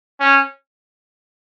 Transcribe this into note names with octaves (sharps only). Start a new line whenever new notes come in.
C#4